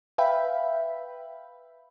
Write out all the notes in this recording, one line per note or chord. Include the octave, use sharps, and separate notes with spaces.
B4 E5 F5 G5 B5